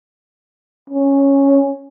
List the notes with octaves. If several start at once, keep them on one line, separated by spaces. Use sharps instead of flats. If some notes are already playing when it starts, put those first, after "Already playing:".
C#4